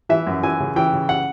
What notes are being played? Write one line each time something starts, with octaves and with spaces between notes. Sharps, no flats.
E3 E5
F#2
E3 G#5
C#3
E3 G5
C#3
F#5